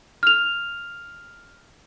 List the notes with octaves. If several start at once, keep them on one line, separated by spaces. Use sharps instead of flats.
F6 F7